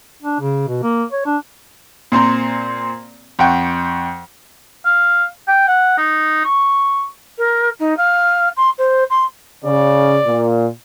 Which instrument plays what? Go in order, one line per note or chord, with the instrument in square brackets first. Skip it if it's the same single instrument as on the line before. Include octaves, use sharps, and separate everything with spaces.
[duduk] D4
C#3
B2
A#3
C#5
D4
[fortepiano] A#2 C4 C5 A#5
F2 F#5 G5 C#6
[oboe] F5
G5
F#5
D#4
C#6
[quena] A#4
D#4
F5
C6
C5
C6
[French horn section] C#3 [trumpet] D5
[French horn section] A#2